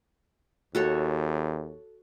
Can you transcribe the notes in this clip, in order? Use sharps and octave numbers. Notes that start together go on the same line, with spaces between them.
D#2 F#4 A4 C#5